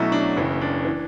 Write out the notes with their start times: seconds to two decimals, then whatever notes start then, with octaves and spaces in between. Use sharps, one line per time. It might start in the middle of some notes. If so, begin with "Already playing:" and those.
Already playing: B1 B2 F#3 A3 C#4 E4
0.12 D4
0.37 F#1 F#2 C#3 E3 E4
0.61 D4
0.85 E3